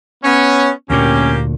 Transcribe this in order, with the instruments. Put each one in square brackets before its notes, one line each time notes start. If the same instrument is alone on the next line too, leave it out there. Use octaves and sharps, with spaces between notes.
[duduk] B3 [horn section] C#4
[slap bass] D2 A#2 [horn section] A#3 G4 [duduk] C#4